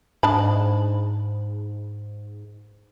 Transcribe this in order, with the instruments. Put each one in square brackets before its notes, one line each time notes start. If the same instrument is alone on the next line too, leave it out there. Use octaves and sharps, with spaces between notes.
[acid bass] G#2 [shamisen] D4 A5 B5